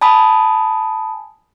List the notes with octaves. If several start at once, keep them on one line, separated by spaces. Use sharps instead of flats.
G#5 A5 B5 D#6